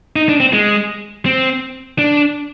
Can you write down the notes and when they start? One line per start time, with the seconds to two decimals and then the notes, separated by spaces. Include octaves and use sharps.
0.16 D#4
0.29 D4
0.40 C4
0.53 G#3
1.26 C4
1.99 D4